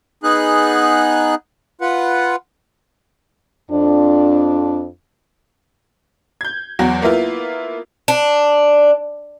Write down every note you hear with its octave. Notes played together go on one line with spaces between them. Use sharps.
B3 D#4 G#4 F#6
F4 B4 F#5
F2 D4
G6 G#6
E2 F#3 F#4
A#3 B3 E4 F4
D4